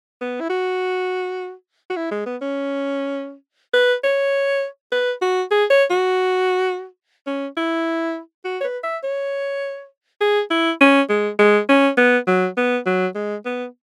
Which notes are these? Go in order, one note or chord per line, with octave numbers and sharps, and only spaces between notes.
B3
E4
F#4
F#4
E4
G#3
B3
C#4
B4
C#5
B4
F#4
G#4
C#5
F#4
C#4
E4
F#4
C#5
B4
E5
C#5
G#4
E4
C#4
G#3
G#3
C#4
B3
F#3
B3
F#3
G#3
B3